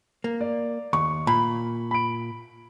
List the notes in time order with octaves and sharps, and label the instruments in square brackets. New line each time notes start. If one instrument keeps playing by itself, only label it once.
[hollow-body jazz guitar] A#3
[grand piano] D5
[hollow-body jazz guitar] D#2 [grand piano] C#6
[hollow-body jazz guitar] A#2 [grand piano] B5
[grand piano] B5 D7